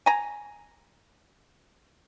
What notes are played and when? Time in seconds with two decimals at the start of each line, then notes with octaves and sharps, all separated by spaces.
0.06 G#5 A#5